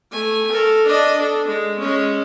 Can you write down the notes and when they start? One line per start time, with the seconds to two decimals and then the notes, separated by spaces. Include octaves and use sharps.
0.11 A3 G#5
0.52 A4 A#4
0.87 D4 D#5
1.18 D4 A4
1.48 G#3
1.80 G#3 C#4